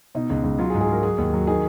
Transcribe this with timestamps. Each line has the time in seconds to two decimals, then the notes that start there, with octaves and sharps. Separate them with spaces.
0.15 B2 D#4
0.30 C#2
0.44 C#2
0.59 F#3 F4
0.70 G#4
0.74 G#2
0.81 G#4
0.88 F#3 A#4
1.03 F#3 G#4
1.18 D#2
1.34 F#3
1.47 D#3 G#4